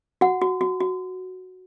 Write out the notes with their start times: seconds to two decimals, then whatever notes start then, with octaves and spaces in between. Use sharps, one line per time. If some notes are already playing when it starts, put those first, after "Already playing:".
0.21 F#4 F#5
0.41 F#4
0.61 F#4
0.80 F#4